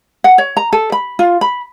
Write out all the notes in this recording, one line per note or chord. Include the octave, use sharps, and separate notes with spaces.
F#5
C#5
A#5
A4
B5
F4
B5